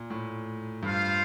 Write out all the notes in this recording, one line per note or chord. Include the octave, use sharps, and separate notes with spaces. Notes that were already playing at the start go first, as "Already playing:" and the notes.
Already playing: A#2
A2
G2 F4 C5 F5